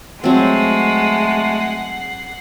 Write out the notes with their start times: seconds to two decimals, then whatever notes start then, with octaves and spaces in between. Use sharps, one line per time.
0.24 F#3 G#3 A3 C4 F#5 C7